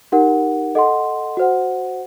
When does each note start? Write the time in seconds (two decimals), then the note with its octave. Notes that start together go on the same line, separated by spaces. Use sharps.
0.12 D#4 G4 A#4 F#5
0.75 A4 D#5 F#5 C6
1.37 F#4 C5 F#5